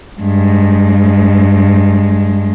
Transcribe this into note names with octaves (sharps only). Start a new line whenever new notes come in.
G2 G#3